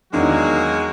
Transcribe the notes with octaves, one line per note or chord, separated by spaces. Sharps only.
E2 D#3 F#3 G#3 A#3 D4 F#4